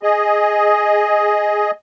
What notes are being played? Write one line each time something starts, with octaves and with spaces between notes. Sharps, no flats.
G#4 D#5